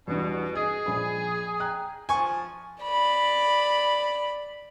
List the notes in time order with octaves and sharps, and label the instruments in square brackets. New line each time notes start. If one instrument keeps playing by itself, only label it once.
[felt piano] E2 G2 [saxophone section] B2
[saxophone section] G#4 [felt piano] D#5
[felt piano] A#1 B5
G5 A#5 F#6
[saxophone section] F3 [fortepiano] G#5 C#6
[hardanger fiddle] D5 B5